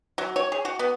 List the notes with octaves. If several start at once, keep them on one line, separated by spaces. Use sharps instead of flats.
F#3
C#5
G#4
F#4
B3